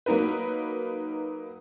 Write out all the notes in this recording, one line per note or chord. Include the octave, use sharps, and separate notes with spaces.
F#3 A#3 D#4 A#4 B4